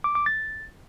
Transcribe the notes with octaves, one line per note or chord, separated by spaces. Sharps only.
D6
D6
A6